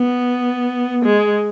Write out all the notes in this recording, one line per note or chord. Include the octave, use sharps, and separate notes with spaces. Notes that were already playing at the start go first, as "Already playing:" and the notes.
Already playing: B3
G#3